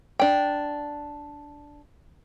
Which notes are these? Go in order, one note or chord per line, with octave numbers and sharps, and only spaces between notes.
D4 G5